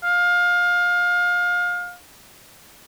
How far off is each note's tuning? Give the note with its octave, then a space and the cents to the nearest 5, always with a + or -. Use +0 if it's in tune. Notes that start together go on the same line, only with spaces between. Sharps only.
F5 +25